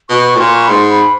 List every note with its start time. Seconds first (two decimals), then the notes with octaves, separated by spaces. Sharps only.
0.09 B2 C#6
0.25 C#6
0.36 A2
0.39 A#2 C6
0.55 C#6
0.65 B5
0.69 G#2 C6
0.90 B5